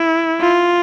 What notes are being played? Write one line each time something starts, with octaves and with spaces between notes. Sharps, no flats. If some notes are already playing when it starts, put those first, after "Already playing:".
Already playing: E4
F4